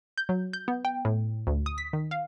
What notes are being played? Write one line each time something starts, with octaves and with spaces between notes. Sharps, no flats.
G6
F#3
G6
B3
G5
A2
D2
D#6
B6
D#3
F5